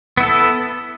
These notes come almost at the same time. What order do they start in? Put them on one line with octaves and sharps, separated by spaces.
B3 E4 A4